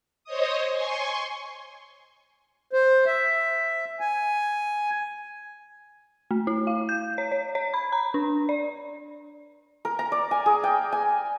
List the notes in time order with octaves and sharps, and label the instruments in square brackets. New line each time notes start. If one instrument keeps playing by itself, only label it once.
[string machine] C5 C#5 D#5 D#6
G#5 C6 C#6
[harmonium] C5
E5
G#5
[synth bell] A3
E4
F5
G6
C#5
C#5
C#5
B5
A#5
D4
D5
[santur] A#4
A#5
D5
G#5
G#4
G5
G#5